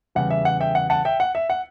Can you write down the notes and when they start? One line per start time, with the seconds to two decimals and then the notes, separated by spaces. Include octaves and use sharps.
0.15 E2 C#3 G3 F#5
0.30 E5
0.45 F#5
0.60 E5 G5
0.75 F#5
0.90 F#5 A5
1.05 E5 G5
1.20 F#5
1.35 E5
1.50 F#5